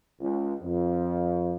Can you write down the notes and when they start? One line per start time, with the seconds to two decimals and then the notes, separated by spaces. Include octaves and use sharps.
0.20 C#2
0.62 F2